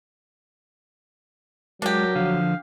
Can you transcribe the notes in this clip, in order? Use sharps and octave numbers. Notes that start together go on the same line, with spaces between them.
F#3 G#3 D4 G4 A#4
D3 F3 F5